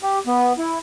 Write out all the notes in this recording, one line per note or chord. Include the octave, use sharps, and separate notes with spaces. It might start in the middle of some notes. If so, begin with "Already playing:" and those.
G4
B3
E4